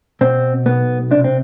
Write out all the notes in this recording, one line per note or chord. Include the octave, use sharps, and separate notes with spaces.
B2 C4
B1 B3
C3 D4
C4